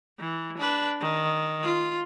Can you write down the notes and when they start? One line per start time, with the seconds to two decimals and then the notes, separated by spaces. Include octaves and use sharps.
0.19 E3
0.58 D4 B4
1.01 D#3
1.63 F4